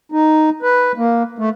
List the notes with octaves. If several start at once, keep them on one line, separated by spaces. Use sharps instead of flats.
D#4
B4
A#3
A3